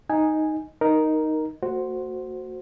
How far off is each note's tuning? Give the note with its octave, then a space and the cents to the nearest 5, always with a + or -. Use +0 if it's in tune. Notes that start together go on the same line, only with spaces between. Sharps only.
D#4 +0 G#5 -5
D#4 +0 A#4 +0
A#3 -45 F#4 +0 C5 +0